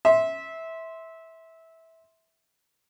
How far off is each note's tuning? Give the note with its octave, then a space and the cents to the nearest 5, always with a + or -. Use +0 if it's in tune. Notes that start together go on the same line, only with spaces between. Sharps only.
E5 -15 C6 +0